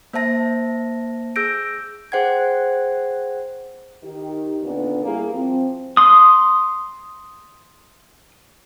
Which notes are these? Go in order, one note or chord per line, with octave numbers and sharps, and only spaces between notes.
A#3 C5 E5 A5 A#6
G#4 E6 G6 A#6 D7
G#4 C5 F#5 G5 G#6
D#3 D#4 G4
D#2 A#2 D3 B3 C#4 D4
G3 A#3 E4 G#4
F3 C4
C6 D#6